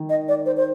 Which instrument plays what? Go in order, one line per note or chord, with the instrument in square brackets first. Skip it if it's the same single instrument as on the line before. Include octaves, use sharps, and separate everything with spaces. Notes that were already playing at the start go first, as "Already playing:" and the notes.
Already playing: [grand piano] D#3
[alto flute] D#5
D5
C5
C5